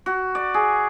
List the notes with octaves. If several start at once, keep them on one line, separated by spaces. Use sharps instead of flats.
F#4
D5
G#4